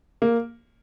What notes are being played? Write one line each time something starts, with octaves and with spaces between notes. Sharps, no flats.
A#3